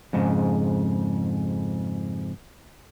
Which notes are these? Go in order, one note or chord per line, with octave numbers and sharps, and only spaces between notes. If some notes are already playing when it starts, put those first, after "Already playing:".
F2 G#2 C#3